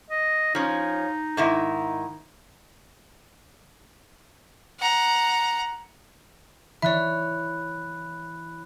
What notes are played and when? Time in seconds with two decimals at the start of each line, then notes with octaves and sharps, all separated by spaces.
0.10 D#5
0.55 F3 C#4 D#4
1.37 G#2 D#3 E4
4.79 F#5 A#5
6.82 E3 C#5 D5 E5 B5 F#6